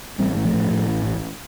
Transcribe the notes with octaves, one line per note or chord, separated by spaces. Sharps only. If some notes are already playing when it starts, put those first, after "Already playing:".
A1 G3 C4
A2
F3 A3
A2
A2
A1
A1